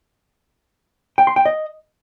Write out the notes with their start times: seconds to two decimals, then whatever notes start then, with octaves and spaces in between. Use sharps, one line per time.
1.18 G5
1.27 C6
1.36 G5
1.46 D#5